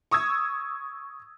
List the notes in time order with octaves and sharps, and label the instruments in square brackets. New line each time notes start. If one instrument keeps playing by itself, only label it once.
[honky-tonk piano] C#6 D#6 E6 G#6